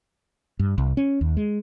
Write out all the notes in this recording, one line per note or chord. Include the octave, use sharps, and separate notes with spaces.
G2
C2
C#4
D#2
G#3